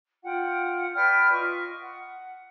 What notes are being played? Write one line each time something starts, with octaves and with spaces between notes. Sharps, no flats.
F4 F#5 G5
B4 D5 G5 F6
F4 D#5 C#6
F#5